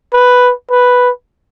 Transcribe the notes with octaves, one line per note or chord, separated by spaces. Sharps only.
B4
B4